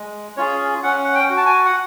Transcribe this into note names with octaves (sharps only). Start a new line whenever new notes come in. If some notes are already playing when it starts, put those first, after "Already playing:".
Already playing: G#3
C#4 F4 G#4 C#5
C#4 F#5
F#5
G5
F#4
A5
G#5
F#5